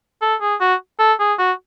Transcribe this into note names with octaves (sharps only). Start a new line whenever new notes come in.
A4
G#4
F#4
A4
G#4
F#4